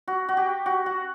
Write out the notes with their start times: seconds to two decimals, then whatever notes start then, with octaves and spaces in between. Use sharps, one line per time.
0.08 F#4
0.29 F#4
0.37 G4
0.66 F#4
0.86 F#4